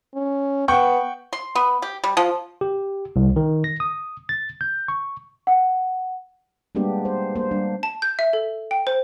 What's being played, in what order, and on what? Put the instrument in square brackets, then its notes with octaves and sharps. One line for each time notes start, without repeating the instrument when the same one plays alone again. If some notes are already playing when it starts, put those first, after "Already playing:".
[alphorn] C#4
[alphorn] B3 [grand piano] F#5 G5 C#6
[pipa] C6
B3
G4
G3
F3
[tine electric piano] G4
C2
D#3
A#6
D#6
A6
G6
C#6
[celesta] F#5
[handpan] G3 G#3 A#3 B3 D4 G4
C5
A#3 C5
G3 D4
[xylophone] A5
G6
E5
A4
G5
C5